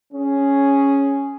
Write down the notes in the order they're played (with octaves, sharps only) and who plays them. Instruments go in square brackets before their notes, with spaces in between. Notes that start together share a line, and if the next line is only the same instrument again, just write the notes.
[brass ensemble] C#4 G#4